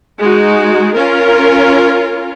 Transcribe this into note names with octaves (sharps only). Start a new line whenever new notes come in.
G#3 D#4 F#4
C#4 F4 A#4